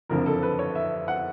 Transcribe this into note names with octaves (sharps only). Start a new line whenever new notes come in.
F#1 F2 D3 F3 A#4
A4
B4
C#5
E5
F#5